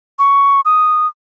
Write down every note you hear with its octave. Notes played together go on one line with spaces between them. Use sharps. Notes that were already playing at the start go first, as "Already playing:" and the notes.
C#6
D#6